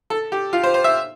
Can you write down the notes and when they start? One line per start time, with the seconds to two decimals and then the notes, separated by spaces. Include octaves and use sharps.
0.10 A4
0.32 G4
0.53 F4
0.63 C5
0.74 C5
0.84 E5